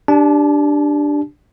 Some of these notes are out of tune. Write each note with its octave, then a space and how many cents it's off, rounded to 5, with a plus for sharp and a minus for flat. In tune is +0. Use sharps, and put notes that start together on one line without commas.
D4 +0 G4 +0 A5 -40